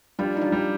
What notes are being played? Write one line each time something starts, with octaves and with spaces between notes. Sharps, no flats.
G3 D4 F4
D#4
D4 F4
G3